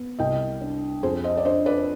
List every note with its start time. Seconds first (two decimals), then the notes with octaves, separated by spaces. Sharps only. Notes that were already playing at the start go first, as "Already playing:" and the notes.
Already playing: B3
0.19 C2 D#5 G5
0.61 D4
1.03 F2 G#4 C5
1.24 C5 D#5
1.37 D5
1.45 D4 C5 D#5
1.66 B4 D5